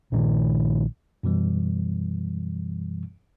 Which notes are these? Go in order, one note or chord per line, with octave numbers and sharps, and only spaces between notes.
A#1 A#2 D3 D#3
F#2 B2 E3 G3